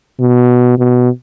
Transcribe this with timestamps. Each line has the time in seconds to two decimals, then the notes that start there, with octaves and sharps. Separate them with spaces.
0.20 B2
0.78 B2